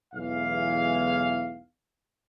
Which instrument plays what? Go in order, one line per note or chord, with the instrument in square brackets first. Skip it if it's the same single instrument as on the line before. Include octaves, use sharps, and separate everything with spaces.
[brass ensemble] B1 E2 E3 G#3 F5